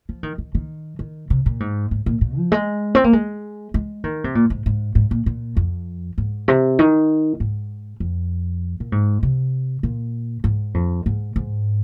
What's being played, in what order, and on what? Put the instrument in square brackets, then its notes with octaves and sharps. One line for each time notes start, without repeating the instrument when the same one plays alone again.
[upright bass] F3
D#3
D#3
D#3
D#3
C3
A#2
G#2
G#2
A#2
A#2
F3
G#3
C4
A#3
G#3
G#3
D#3
C3
A#2
G#2
G#2
G#2
A#2
A#2
F2
G#2
C3
D#3
G#2
F2
A#2
G#2
C3
A#2
G#2
F2
G#2
G#2